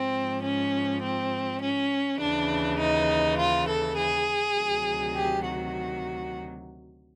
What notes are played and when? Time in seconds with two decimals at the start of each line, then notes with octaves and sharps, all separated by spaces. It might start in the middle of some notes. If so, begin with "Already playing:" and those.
Already playing: G#2 F3 C4
0.43 C#4
1.02 C4
1.61 C#4
2.19 D#2 C#3 E3 D4
2.79 D#4
3.38 F4
3.67 A4
3.97 G#4
4.56 D2 C3 D#3 F#3
5.15 G4
5.44 F#4